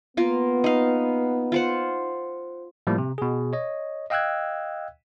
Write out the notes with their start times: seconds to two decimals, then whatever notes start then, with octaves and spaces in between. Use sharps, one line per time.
0.17 A#3 B3 F4
0.64 D#4 F5
1.52 F4 C5 F#5
2.87 A2 F3 G3 A#3
2.98 C3
3.18 B2 G#4
3.53 C#5 D#5
4.10 D#5 F5 G5 E6 F#6 G#6